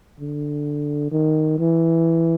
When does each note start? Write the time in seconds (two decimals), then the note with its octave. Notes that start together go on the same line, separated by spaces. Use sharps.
0.20 D3
1.11 D#3
1.59 E3